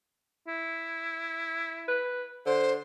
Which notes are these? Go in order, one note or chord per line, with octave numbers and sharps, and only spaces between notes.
E4
B4
D3 C5